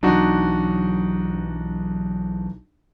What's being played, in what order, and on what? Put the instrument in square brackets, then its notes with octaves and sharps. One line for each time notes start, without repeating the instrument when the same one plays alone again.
[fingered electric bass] B1 E3 F#3 [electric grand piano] D4 D#4 F#4